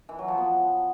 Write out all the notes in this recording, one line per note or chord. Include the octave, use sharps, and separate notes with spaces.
E3
F#3
F3
B3